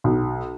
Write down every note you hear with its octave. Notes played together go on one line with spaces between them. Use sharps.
B1